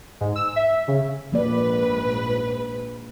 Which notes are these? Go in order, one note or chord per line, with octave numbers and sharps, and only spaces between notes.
G#2
E6
E5
C#3
A#1 G#2 F3 A#3 B4 D5